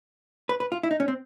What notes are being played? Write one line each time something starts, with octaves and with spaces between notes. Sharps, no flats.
B4
B4
F4
E4
D#4
C#4
C4